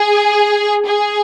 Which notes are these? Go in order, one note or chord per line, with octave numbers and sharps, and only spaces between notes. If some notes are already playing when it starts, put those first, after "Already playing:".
Already playing: G#4
G#4